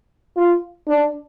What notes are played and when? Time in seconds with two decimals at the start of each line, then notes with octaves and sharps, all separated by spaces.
0.37 F4
0.88 D4